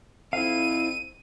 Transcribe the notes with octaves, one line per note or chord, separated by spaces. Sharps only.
F2 C4 E4 F5 D#7